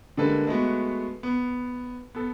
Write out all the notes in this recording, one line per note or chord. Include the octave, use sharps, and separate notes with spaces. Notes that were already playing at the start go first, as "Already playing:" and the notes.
D3 G3 G#3 A#3 A4 B4
G#3 A3 B3 F#4
B3
B3 A4